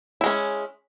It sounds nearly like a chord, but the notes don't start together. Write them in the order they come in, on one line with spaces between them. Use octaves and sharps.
E4 G#3 C#4